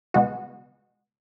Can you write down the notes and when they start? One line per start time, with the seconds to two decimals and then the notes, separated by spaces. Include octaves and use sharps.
0.14 C#2 B2 G#3 B3 F#4